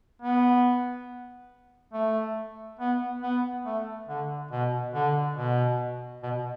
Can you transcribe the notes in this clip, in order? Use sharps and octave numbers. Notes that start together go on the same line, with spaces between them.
B3
A3
B3
B3
A3
D3
B2
D3
B2
B2